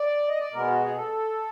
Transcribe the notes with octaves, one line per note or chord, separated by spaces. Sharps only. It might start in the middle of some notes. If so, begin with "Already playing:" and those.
Already playing: D5
D#5
D5
B2 G#3 B3 A#4
F#4
G#4
A4